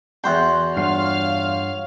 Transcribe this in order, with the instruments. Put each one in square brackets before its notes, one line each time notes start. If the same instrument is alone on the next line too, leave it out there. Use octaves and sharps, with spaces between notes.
[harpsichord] E2 C5 G5 [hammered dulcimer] F#4 C6
[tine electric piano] G2 F#5 C7 [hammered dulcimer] F4 C#5 [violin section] F5 F6